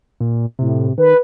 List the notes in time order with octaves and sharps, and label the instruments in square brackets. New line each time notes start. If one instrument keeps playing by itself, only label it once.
[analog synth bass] A#2
[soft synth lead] A2 [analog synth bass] C3
[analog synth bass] D#3 [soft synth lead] B4